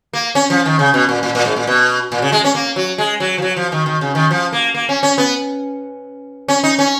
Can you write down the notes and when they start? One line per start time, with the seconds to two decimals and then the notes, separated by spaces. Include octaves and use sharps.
0.13 A#3
0.35 C#4
0.50 F3
0.66 D#3
0.79 C#3
0.94 B2
1.09 A#2
1.23 A#2
1.35 A#2
1.45 G#2
1.56 A#2
1.67 B2
2.12 A#2
2.22 C#3
2.32 G#3
2.44 C#4
2.55 A#3
2.76 F#3
2.98 G#3
3.20 F#3
3.38 F3
3.42 F#3
3.57 F3
3.72 D#3
3.86 D#3
4.01 C#3
4.15 D#3
4.31 F3
4.53 A#3
4.74 A#3
4.89 C#4
5.03 C#4
5.18 B3
6.48 C#4
6.64 D#4
6.79 C#4